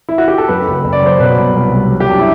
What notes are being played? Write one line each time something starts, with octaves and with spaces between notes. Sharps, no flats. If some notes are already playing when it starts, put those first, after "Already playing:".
E4
F#4
G4
A4
F#2 B4
F#1
F#1
D5
F#3 C5
B2 B4
C2
C2
G3
F#3
G4
F#2 D4
E4